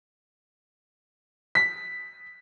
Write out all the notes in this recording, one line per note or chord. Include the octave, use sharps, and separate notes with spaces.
B6